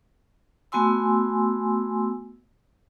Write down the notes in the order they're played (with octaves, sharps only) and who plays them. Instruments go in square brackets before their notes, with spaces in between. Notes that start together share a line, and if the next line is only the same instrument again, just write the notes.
[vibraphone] A3 B3 F#4 G#5 C6 E6